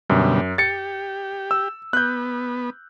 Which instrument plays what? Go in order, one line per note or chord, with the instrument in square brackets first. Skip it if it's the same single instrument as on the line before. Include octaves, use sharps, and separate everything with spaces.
[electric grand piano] F#2 [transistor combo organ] B2 D3 G3
[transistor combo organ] G4 [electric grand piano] A6 C#7
[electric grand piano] E6
[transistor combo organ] B3 [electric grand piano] F#6 G6